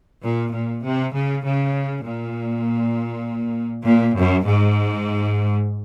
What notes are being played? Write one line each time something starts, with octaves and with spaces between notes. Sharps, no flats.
A#2
A#2
C3
C#3
C#3
A#2
A#2
F#2
G#2